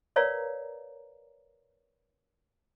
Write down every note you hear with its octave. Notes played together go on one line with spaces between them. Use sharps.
A#4 B4 C#5 D5 F5 A#5